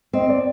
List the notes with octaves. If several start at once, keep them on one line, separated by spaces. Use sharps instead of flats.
C4 D#5
D5